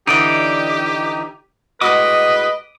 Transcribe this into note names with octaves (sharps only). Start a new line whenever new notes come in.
D3 E3 D#4 G4 D5 D#5
A2 G#3 F#4 B4 D#5 D6 D#6